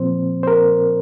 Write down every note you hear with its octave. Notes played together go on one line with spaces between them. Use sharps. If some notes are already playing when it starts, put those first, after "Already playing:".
Already playing: A#2 F3 C4 C5
C5
A#4